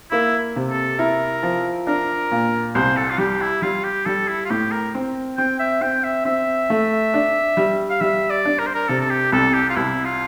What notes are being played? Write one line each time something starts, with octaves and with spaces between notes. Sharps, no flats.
A#3 E4
C3
A4
E4 A#4
F3
D4 A#4
A#2
C2 C5
A4
F4
G3 G4
E4
G3 F4
G4
G3 A4
E4
F4
A2 G4
A#4
C4
C4 G5
E5
C4 G5
E5
C4 E5
A3
D4
G3
F5
G3 E5
D5
D4
A#4
C5
A#4
C3 A4
A4
G4
C2 A4
G4
F4
C2 E4
F4